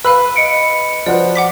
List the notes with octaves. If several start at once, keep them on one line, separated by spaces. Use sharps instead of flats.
B4 F5 B5 E6
D#5 C#7 D7
F3 F#4 B4 D5
F#5 D6 B6